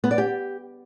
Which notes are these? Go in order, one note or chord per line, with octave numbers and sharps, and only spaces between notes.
B3
D5
G4